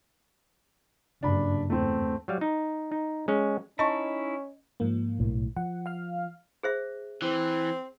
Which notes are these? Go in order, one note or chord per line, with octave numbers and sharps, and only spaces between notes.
F#1 G2 D4 B5
E2 A3 C4
F#3 G3 F5
D#4
D#4
G#3 C#4
C#4 D#4 E4 D#5 A5 C6 C#6
G#2 F3 A#3
B1 A2
F3 F#5
F5 F6
G#4 C5 E5
E3 C4